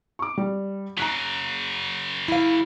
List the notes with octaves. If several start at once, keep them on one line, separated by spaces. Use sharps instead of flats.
C#6 D6
G3
C#3 F#3 A#5 F#6 B6
E4 F5